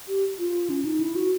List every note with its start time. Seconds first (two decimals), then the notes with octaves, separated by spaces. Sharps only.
0.08 G4
0.39 F4
0.70 C#4
0.85 D#4
1.00 E4
1.16 F#4